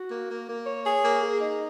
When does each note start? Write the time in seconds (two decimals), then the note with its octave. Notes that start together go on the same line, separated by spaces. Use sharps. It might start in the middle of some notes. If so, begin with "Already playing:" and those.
Already playing: F#4
0.10 A#3
0.29 A#3
0.48 A#3
0.66 C#5
0.85 G#4
1.04 A#3
1.22 G#4
1.40 D#4